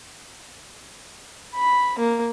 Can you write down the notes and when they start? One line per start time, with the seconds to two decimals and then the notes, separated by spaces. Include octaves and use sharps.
1.56 B5
1.99 A#3